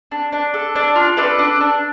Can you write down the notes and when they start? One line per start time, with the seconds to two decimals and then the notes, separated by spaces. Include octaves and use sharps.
0.11 D4
0.32 D4
0.54 A4
0.76 D4
0.96 F4
1.17 D4 A4 B4
1.39 D4
1.60 D4